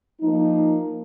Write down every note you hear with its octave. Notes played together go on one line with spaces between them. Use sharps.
F3 A#3 D#4